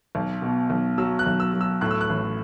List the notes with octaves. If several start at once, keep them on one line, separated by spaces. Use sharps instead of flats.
B1
B2
B1
F#3 E6
F#6
B1
E6
F#3
E6
A2 F#6
E6
F#6
A1